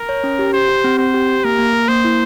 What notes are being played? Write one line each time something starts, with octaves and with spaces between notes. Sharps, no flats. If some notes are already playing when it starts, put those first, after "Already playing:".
Already playing: A#4
C#5
C#4
G4
G4 C5
G4
C4
C4 C5
G4
G4
A#3 A#4
A#3
A#3
A#3 C5
E4